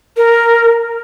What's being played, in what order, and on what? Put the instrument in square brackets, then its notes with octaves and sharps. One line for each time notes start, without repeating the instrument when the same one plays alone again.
[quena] A#4